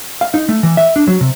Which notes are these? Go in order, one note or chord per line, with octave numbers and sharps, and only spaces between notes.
F5
D#4
A3
E3
E5
D4
F#3
C3